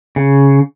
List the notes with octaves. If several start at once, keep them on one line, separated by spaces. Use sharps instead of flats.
C#3